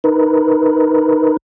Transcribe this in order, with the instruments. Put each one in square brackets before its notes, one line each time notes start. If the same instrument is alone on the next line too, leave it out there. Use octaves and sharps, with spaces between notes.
[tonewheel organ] D#4 A#4 B4